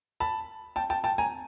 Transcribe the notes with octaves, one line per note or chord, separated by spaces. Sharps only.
A5 B5
G5 A5
G5 A5
G5 A5
G#5 A#5